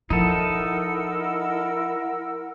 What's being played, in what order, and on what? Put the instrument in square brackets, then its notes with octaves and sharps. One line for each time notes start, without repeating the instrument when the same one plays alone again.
[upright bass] F3 [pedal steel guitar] D#4 A4 [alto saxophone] E4 [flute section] A#4 F#5 E6